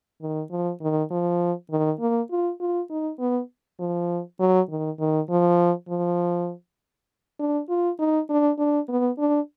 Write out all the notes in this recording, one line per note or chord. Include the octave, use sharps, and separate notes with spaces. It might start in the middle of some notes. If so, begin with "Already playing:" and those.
D#3
F3
D#3
F3
D#3
A#3
F4
F4
D#4
B3
F3
F#3
D#3
D#3
F3
F3
D4
F4
D#4
D4
D4
B3
D4